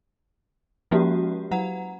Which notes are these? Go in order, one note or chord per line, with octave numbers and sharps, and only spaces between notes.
F3 G#3 A#3 C#4 F#4 G4
F#3 F#5 A#5